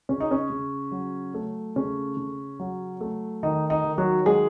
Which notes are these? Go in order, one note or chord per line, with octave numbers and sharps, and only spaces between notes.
C#3 C#4
D#4
C#4
C#3
F#3
A3
C#3 C#4
C#3
F#3
A3
D#3 D#4
D#4
D#3
F#3 F#4
F#3 G#3 G#4